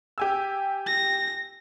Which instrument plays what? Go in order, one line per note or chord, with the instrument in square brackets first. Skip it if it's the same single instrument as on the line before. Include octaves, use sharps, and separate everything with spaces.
[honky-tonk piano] G4 G#5 E6
[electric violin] A#6